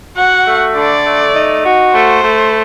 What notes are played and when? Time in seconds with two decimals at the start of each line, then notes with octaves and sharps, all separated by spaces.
0.17 F#4 F#5
0.46 A3
0.75 D3 D5
1.04 A3
1.34 D#4
1.63 F#4
1.92 A3 C5
2.22 A3